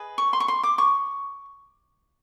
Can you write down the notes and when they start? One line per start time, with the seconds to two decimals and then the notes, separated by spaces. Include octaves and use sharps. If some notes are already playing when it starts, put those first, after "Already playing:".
Already playing: G#4 B4 D#5
0.18 C#6
0.33 C6
0.40 C#6
0.48 C6
0.63 D6
0.78 C#6